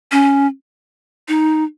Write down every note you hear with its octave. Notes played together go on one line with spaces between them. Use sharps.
C#4
D#4